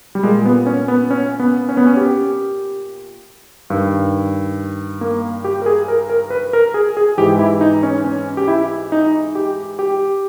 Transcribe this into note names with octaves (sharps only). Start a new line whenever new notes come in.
G3
A#2 G#3
B3
C#4
B3
C#4
B3
C#4
B3
C#4
G4
G2 D#3
A#3
G4
A#4
G#4
A#4
A#4
B4
A#4
G#4
G#4
G#2 E3 G4
E4
D#4
C#4
C#4
G4
E4
D#4
G4
G4